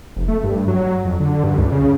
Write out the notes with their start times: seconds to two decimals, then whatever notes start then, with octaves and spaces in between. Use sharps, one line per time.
0.16 F1
0.28 A3
0.44 G2
0.68 F#3
1.05 F2
1.20 D3
1.44 G2
1.58 C#2
1.72 C#3